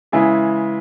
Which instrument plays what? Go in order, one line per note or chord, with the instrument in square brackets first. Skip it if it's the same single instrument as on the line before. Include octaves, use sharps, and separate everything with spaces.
[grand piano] C#3 E3 G#3 E4 G#4